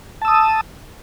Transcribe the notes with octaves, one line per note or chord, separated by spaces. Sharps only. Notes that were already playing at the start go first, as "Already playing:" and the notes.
A5 D#6 E6